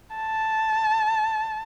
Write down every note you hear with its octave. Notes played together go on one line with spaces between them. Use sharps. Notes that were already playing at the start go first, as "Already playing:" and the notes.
A5